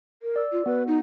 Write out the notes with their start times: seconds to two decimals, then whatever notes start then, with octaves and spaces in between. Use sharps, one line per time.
0.23 A#4
0.36 D5 E6
0.52 F4
0.66 B3 F#4 B4
0.87 D#4